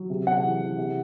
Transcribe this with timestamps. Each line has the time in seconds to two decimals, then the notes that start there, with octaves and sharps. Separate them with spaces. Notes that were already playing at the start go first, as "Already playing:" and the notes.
Already playing: F#3
0.10 C3
0.26 C3 F#5
0.43 E3
0.61 E3
0.78 C3